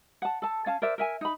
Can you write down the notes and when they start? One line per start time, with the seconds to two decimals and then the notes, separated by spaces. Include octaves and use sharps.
0.22 F#5 A5
0.42 A4 A5
0.66 C#4 F5 A5
0.82 A#4 C5 D5 E5
0.98 A#4 E5 G#5
1.21 D#4 B5